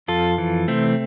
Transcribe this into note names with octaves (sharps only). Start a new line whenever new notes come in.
F2 F4 A4
E3
C3 A3 C4